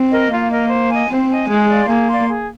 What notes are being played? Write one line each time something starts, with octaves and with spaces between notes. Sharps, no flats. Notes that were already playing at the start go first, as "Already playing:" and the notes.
Already playing: C4
A#4 D#5
A#3 F4
A#4 D#5
C5
D#5 G#5
C4 C5
D#5 G#5
G#3 G#4
D5 F5 C6
A#3 G#4
D5 F5 C6
G#4